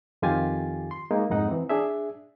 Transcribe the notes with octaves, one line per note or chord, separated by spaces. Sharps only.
F2 D#3 F4 G4 G#5 A6
C6
G#3 A#3 D#4
F2 G#2 D#4 F#5
E3 C4
D4 G#4 E5